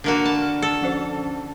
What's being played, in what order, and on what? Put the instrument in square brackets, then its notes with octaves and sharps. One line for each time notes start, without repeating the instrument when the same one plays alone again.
[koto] D3 A#3 F#4
[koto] A5 [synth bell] B5 C#6
[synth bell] F6
[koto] A4
[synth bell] F3 C#4 C5